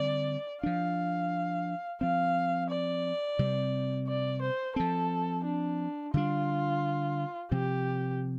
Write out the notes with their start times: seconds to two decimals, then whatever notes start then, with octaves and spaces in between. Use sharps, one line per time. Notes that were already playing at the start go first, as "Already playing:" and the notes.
Already playing: D3 G3 C4 D5
0.63 F3 D4 F5
2.01 F3 C4 F5
2.70 D5
3.39 C3 G3 C4
4.08 D5
4.42 C5
4.76 F3 C4 A4
5.45 D4
6.14 D3 G3 D4 F4
7.51 C3 F3 C4 G4